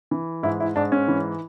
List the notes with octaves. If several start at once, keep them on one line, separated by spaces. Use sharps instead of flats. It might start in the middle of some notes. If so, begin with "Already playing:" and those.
E3
G#2 E4
E4
G#2 D4
C#4
E3